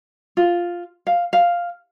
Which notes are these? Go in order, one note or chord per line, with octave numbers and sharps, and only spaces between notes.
F4
F5
F5